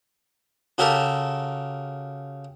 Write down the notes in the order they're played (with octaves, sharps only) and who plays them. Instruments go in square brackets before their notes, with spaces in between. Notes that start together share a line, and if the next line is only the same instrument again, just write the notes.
[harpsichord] C#3 F#4 G4 A4 A#4